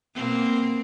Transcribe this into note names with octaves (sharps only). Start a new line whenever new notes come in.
B2 A#3 C4